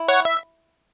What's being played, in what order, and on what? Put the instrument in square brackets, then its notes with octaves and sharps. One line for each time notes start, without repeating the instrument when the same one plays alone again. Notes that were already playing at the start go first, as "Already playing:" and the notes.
Already playing: [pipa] E4
[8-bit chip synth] C#5 F#5
E5